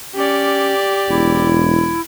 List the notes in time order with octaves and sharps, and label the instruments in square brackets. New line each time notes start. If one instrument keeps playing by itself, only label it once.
[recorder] C#4 [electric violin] G4 D5
[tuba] E1 [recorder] E4